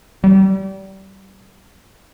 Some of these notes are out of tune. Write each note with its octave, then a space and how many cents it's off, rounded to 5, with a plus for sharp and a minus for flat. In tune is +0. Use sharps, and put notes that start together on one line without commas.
G3 -30